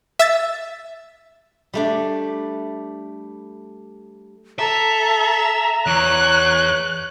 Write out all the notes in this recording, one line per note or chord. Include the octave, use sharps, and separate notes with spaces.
E5 E6 A6
G3 A3 D4
A4 E5 A#5
E2 C#5 F#6